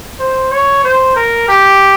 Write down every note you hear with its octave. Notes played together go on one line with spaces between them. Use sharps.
C5
C#5
C5
A#4
G4